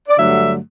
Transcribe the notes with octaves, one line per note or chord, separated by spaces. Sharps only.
D5
G2 D3 F#3 A3 E5